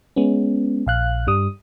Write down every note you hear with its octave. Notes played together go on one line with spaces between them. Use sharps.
G#3 B3 C#4
A#1 F5 F#6
G2 G3 D#6